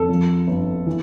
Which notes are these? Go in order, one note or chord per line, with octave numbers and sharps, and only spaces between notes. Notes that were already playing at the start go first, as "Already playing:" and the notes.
Already playing: F2 A4
F3
G1
E3